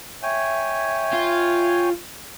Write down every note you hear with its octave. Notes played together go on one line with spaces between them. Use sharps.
C#5 E5 G5 G#5
F4